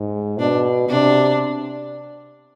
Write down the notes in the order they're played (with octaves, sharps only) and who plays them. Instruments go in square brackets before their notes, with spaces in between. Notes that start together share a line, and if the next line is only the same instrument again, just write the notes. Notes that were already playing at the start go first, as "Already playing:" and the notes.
Already playing: [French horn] G#2
[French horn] B2 [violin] D4
[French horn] C3 [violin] D4